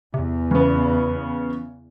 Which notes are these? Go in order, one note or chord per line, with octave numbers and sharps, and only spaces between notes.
E2 C3
C#3 E3 B3